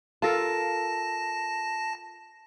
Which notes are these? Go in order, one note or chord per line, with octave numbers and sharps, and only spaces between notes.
F4 A4 A#4 A5 A#6